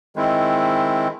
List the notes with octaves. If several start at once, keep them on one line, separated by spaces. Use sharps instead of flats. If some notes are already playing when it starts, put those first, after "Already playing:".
D#3 G#3 C4 E4